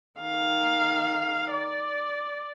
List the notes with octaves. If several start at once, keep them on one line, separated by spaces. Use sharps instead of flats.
D#3 F5
D5